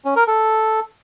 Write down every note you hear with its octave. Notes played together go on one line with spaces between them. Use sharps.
C#4
A#4
A4